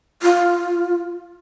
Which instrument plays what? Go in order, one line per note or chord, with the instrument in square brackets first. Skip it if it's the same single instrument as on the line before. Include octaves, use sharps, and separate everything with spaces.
[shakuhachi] F4